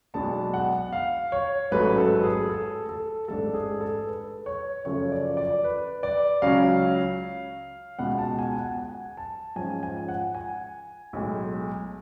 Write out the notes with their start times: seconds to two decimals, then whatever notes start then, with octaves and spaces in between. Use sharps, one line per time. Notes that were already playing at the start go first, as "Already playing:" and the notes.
0.14 B1 B2 G#3 B3 D4 A5
0.54 F#5
0.93 F5
1.32 C#5
1.71 A1 G#2 F#3 A3 C#4 B4
1.98 A4
2.23 G#4
2.49 A4
2.89 A4
3.28 A1 G#2 G#3 D4 A4
3.54 G#4
3.81 A4
4.07 B4
4.46 C#5
4.85 F#2 C#3 F3 A3 C#5
5.12 D5
5.37 D5
5.64 B4
6.03 D5
6.42 C#2 C#3 F#3 C#4 F5
7.99 C#2 B2 G#3 F#5
8.19 A5
8.39 G#5
8.58 F#5
8.78 G#5
9.17 A5
9.56 G#2 F3 G#3 C#4 G#5
9.83 G#5
10.08 F#5
10.35 G#5
11.13 B1 A2 G#3